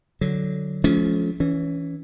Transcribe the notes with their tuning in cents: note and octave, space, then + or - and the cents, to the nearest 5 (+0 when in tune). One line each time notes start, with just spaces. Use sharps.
D3 +0 F#3 +0
F3 +0 A3 -45 C#4 +20
E3 +0 C#4 +20